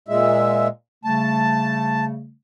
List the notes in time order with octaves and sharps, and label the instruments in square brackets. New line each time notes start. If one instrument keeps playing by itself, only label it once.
[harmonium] A#2 G#3 E5
[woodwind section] C#3 G3 A3 [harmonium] A5